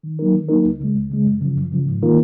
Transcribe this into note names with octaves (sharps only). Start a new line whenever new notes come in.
D#3
F#3 A#3 D#4 A#4
D#3
F#3 A#3 D#4 A#4
C#2
C#3 G#3
C#2
C#3 G#3
F#2
C#3 F3
F#2
C#3 F3
G#2
D#3 A#3 F4 A#4